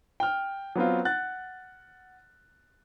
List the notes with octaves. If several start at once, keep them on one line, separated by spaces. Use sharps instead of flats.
G5 F6
F#3 B3 C4 F4
F#5 F#6 A6